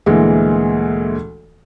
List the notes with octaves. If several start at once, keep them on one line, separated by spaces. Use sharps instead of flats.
D2 A#2 E3 G#3